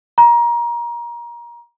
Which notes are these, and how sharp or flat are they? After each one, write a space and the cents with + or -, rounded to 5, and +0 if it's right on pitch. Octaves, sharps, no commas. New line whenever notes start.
A#5 +25